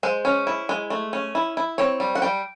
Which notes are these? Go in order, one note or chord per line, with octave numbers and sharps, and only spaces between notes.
G#3 C5
C#4
E4
G#3
A3
C#4
E4
E4
C4 C#5
G3
F#5
G3 G5